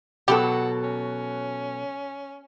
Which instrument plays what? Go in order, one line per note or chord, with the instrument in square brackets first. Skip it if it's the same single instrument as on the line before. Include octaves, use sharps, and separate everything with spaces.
[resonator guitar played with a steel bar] B2 F#3 A4 [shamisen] G4 [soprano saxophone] F#5
[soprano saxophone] C#4